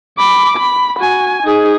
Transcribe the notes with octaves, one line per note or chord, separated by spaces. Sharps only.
B5 D6
B5
F#4 G#5
D#4 G#4